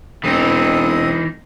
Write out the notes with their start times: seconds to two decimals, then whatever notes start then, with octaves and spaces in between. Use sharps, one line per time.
0.24 E1 E3 C4 D#4 E4 D#6